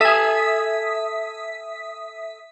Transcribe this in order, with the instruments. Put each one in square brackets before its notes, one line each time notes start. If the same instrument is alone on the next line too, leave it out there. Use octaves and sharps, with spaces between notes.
[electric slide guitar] A4 G#5 [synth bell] E5 D#6 B6